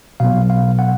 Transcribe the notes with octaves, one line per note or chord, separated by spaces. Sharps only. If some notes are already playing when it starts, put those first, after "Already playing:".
B2 F#3 B3 F5
F5
F#5